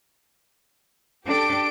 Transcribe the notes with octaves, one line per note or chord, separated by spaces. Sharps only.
D4 G4 A4 D7